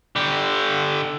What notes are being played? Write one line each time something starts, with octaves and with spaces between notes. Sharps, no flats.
D3 G4